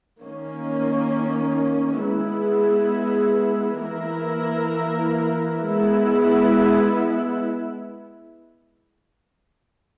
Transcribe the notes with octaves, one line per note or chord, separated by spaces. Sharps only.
D#3 A#3 C#4
G#3 B3 E4 G#4
E3 A#3 E4 A#4
G#3 B3 E4